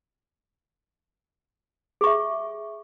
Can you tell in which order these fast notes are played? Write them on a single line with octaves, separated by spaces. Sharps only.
G#4 C#6 E5